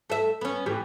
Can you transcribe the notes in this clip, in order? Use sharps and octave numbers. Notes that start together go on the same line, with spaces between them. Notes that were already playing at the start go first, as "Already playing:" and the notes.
A3 E5
B3 C#4
A2 E3 G4